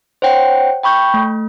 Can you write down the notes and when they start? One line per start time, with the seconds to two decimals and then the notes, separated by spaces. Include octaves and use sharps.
0.22 C5 C#5 F#5 G5
0.83 G5 B5 C#6 G6
1.14 A3